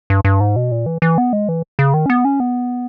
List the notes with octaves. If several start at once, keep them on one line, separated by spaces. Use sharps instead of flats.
G2
G2
G#2
B2
A#2
E3
E3
B3
G#3
E3
C#3
D#3
C#4
B3
C#4
B3